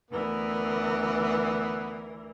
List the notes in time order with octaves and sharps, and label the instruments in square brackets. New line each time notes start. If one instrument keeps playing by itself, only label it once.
[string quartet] D2 E3 A#4 [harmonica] B3